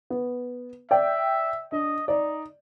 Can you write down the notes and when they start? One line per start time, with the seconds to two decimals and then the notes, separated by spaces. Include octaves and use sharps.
0.10 B3
0.91 D5 E5 G5
1.72 D4 D#5
2.08 D#4 D5